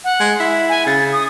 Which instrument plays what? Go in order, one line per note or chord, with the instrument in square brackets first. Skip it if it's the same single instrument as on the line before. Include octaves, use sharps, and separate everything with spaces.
[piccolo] F#5
[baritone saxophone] G#3
E4
[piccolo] G#5
[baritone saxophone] C#3 [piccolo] A6
[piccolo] D#6